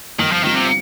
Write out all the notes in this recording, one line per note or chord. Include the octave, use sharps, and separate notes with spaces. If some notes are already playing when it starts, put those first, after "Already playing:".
G1 D#3
F3
G2 D#3 F3 C4
C3